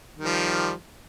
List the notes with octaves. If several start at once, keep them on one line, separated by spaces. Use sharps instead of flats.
D#3 F3 G3